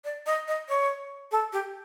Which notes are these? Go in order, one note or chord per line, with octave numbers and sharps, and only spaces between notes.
D5
D#5
D#5
C#5
A4
G4